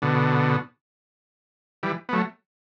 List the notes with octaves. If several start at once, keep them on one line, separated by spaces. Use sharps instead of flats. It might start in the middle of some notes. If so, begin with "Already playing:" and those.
B2 D3
E3 G3
B3
F#3 A3